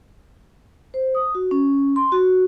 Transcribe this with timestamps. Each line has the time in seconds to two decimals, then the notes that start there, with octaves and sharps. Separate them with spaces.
0.94 C5
1.15 D#6
1.35 F#4
1.51 C#4
1.96 C6
2.12 F#4